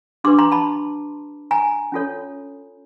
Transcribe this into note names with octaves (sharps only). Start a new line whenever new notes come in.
D4 G4 B4 C6 D6
A#5 C6
A5 B5
G#5 A#5
C#4 F4 A4 C#5